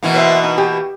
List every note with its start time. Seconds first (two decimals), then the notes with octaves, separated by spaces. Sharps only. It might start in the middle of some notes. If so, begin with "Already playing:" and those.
0.03 B2 E3 A#3
0.14 B4 C5 E5
0.43 D#4
0.58 G4